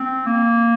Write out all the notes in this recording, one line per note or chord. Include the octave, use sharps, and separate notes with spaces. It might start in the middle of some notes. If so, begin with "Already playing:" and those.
Already playing: C4
A#3